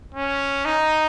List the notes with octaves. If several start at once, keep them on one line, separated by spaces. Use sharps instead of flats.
C#4
D#4